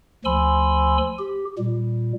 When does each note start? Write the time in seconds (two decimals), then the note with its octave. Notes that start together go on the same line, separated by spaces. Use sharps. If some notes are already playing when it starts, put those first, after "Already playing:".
0.25 D2 F3 G#5 B5 C6 E6
1.19 G4
1.58 A#2 G3